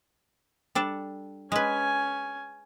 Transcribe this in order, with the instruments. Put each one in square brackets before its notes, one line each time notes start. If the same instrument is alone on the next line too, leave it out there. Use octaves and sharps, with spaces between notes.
[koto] G3 D4 A4
[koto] G#3 B4 [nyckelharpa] C#4 G#5